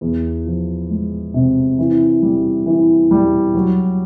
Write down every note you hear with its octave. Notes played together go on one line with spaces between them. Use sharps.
E2
F3
G#3
C3
E3
G3
E3
G3
F#3